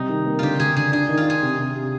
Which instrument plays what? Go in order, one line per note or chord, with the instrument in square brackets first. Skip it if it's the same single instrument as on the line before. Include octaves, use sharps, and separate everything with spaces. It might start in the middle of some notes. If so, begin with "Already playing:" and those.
Already playing: [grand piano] C3 G3 [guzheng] C4 D#4
[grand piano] D#3
A#3
[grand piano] D3 [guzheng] F4 G4
[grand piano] D3 [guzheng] G#4
[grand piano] D3 [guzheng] G#4
[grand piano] D4 [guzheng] G#4
[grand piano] D#3
[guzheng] F4
[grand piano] D4 [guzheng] G#4
[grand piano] C3
C3
C3